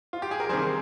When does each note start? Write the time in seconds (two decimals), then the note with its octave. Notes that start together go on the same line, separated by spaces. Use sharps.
0.13 F4
0.22 G4
0.31 G#4
0.40 A#4
0.49 C3 D#3 G3 G#4 C5